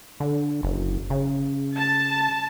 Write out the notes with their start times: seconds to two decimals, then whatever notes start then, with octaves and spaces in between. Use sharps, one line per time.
0.20 D3
0.63 F#1
1.10 C#3
1.77 A5